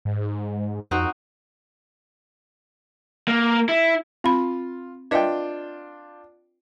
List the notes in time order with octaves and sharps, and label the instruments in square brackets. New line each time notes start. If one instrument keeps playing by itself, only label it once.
[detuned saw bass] G#2
[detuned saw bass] F2 [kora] C4 D#4 F#4
[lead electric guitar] A#3
E4
[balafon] C4 B5 [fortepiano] F4
[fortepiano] D4 F4 G5 [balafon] B4 D#5 E5